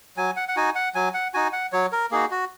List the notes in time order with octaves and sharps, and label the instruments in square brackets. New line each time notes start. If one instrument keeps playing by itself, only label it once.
[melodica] F#3 G#5
F#5
F#5
D#4 F#4 G#5
F#5
F#3 G#5
F#5
D#4 F#4 G#5
F#5
F#3 C#5
A#4
A#3 D#4 F#4 G#4
F#4